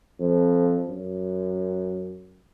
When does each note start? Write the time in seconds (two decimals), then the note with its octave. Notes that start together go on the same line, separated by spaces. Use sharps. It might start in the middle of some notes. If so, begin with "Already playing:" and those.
0.20 F2
0.89 F#2